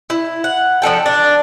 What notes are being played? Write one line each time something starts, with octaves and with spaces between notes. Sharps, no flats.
E4
F#5
F3 D4 A4 G5
D4